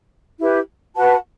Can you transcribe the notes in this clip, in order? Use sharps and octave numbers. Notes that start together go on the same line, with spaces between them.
E4 G4 B4
F#4 B4 F#5 A5